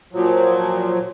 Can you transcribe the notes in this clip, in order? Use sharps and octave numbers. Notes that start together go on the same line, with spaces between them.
A#2 F3 F#3